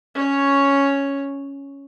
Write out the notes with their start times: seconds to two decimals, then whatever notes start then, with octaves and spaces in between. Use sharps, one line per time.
0.15 C#4 C#5